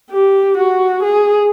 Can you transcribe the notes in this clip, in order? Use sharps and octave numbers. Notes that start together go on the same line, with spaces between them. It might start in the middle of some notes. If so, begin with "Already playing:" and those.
G4
F#4
G#4